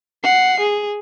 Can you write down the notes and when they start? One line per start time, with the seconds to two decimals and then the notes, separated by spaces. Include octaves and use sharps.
0.23 F#5 C7
0.60 G#4